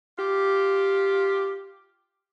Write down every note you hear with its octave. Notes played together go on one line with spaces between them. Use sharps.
F4 G4